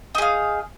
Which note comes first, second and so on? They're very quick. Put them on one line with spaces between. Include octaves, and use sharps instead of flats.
D#4 G#4 F5